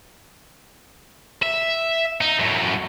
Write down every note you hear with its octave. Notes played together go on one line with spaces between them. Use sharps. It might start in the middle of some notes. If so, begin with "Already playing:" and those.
E5
D#4
F#2 A2